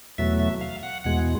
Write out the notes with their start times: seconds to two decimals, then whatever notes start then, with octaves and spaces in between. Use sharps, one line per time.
0.18 E2 B2 F#3 A3 E5
0.39 E5
0.61 F5
0.83 F#5
1.04 E2 B2 G#3 F#5